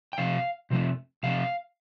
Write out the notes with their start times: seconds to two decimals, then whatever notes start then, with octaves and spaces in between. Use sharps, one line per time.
0.13 G5
0.18 C3 F3 A3 C4 F5
0.70 C3 F3 A3 C4
1.23 C3 F3 A3 C4 F5